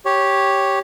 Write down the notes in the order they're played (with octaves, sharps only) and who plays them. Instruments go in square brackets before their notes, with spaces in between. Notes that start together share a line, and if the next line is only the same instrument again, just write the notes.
[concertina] G4 C#5